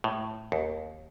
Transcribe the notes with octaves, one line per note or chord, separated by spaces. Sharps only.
A2
D#2